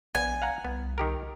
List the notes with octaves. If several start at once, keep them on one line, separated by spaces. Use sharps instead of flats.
A#1 B3 G#5
F5 F#5 A#5
C2 B3
D#3 G4 A#4